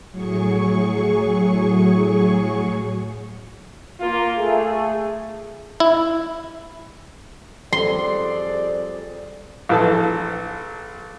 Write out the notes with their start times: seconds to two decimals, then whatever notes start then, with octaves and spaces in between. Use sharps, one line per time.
0.11 A2 F#3 G#4 C#6
4.01 A#3 F4
4.38 A3 G#4
5.80 E4
7.73 F2 G3 G#4 D5 C6
9.69 A#1 E3 A4 A5